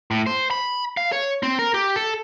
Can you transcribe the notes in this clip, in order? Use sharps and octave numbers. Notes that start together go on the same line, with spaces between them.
A2
C5
B5
F5
C#5
C4
A#4
G4
A4